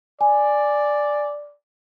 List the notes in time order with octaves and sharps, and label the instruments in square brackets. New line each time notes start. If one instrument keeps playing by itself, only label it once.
[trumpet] D5 [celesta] G#5